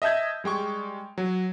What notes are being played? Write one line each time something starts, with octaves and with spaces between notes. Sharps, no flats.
D#5 E5 A5 G6 G#6
G3 G#3 G5 C#6
F#3